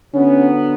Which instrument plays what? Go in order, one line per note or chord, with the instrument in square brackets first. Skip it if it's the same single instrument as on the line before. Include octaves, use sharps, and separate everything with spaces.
[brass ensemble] D3 F#3 B3 [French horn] C#4